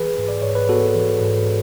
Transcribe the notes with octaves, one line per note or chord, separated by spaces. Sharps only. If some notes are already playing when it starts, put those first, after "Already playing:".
Already playing: E3 G#4 B4
G#2
D5
G#2 C#5
B4
B3 F#4 A4
E3
G#2